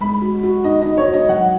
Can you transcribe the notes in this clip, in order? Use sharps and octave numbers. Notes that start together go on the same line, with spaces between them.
G#3 B5
F#4
F#4
D#4 D#5
D#4 D#5
C#5
F#4
D#5
F#3 F#5